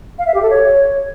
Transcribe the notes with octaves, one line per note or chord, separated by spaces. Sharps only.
F5
E5
G4
A4
C#5